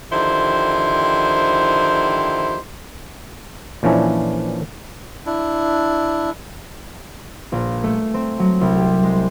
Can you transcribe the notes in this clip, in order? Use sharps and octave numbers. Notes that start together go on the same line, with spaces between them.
D3 D#3 F3 E4 G4 C5
A#2 E3 F3 C#4 D4 E4
D4 E4
A#1
A3
C4
F#3
C2
G4
G#3